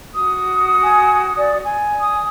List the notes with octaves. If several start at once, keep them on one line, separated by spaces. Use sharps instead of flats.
F#4 D#6
G#5
D5
G#5
D#6